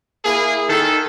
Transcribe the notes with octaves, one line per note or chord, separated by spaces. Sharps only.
A#3 E4 G#4
D#3 A4